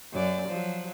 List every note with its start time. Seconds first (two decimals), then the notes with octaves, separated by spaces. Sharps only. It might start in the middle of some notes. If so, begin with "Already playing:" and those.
0.12 F#2 D5
0.49 F3 F#3